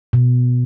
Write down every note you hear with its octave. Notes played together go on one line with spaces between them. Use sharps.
B2